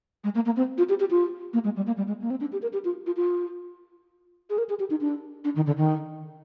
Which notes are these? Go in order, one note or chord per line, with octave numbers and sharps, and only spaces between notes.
G#3
A#3
A#3
C4
F4
G4
G4
F4
A#3
G#3
G3
A#3
G3
G#3
A#3
C4
D4
G4
A#4
G4
F4
F4
F4
G#4
A#4
G#4
G4
D#4
D4
D4
D#3
D3
D#3